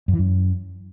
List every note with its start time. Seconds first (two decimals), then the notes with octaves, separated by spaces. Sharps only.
0.08 F#2
0.13 E3
0.19 F#2